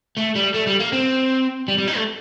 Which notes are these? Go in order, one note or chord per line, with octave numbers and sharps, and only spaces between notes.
A3
G3
A3
G3
A#3
C4
G3
G3
D#4
A3